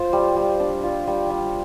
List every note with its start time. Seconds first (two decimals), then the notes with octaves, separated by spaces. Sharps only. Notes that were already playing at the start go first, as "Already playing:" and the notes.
Already playing: F4 C5
0.13 G3
0.36 G3
0.60 D4
0.83 F4
1.07 G3
1.30 G3